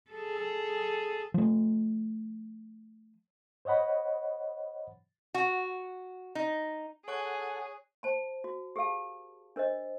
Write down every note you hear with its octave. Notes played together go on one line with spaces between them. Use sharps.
G#4 A4
F3 A3
C5 C#5 D#5 F#5 B5
F#4
D#4
G#4 A4 C#5 F#5 G#5 C#6 F#6
C5 A5 B5
F#4
G4 G#4 A#4 F5 A5
D4 A#4 C5 D#5